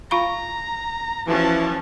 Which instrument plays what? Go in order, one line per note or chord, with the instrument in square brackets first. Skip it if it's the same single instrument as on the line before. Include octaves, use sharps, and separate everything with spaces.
[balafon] F4 F5 B5 [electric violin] A#5
[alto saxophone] E3 [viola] F3 C#4 [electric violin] F#4 A5